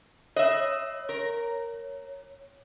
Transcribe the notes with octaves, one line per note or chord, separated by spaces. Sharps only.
C#5 D#5 E5
A#4